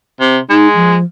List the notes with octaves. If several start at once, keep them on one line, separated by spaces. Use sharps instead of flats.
C3
G#3 D#4
F3